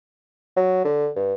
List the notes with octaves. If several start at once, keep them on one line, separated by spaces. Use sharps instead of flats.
F#3
D3
G2